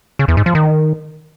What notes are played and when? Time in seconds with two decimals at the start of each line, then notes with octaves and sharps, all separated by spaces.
0.19 C#3
0.28 E2
0.37 G#2
0.46 F3
0.55 D#3